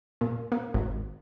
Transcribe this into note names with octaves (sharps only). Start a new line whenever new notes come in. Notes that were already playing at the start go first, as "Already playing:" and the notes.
A#2
A#3
G#1